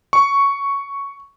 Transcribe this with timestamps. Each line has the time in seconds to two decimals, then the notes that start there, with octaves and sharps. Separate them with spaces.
0.13 C#6